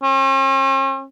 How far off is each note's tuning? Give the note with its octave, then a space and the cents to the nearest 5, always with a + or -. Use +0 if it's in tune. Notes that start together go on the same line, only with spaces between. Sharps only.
C#4 -45